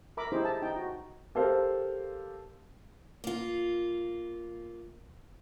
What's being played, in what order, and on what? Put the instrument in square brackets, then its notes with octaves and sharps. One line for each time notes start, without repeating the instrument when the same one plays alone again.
[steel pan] A#4 E5 A#5 B5 D6
D#4 E4 G4 G#4 C5
A5
D#4 G5
F#4
[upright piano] G4 A4 A#4 C5 F5
[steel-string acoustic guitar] A#3 F4